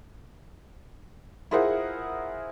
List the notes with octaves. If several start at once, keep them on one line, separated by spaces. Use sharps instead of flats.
E4 F4 G#4 A#4 C5 F#5